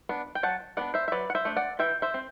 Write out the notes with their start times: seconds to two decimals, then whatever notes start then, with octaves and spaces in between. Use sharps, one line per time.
0.09 B3 D4
0.35 G5
0.43 F#3 F#5 A5
0.77 B3 D4 D5 F#5
0.94 C5 E5
1.08 E5
1.12 F#3 B4 D5
1.30 F#5
1.35 C5 E5
1.45 A3 D4
1.56 D5 F#5
1.79 E3 E5 G5
2.02 C5 E5
2.14 C4